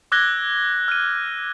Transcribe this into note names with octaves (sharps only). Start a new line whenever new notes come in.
D6 E6 F#6 G#6 A#6 G7
F6 D#7